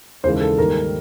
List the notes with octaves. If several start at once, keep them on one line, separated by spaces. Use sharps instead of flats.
D#2 C#3 E3 G#3 C5
A4
G#2 D#3 G3 A#3 A#4